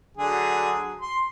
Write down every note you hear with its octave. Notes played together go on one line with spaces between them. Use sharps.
D3 F#3 G#4
C6